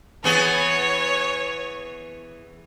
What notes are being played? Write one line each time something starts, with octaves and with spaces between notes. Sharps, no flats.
E3 B3 G#4 C#5